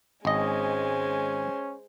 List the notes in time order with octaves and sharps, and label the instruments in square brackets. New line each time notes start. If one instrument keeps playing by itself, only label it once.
[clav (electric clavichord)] G#1 D#5 [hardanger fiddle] G#3 C5 [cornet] C#4